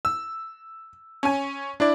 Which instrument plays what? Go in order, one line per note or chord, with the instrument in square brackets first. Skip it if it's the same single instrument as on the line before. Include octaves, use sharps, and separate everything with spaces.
[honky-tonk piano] E6
C#4 G#5
[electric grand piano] D4 E4 D5